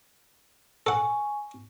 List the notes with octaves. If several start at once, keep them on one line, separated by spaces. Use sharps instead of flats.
A4 F#5 G#5 C#6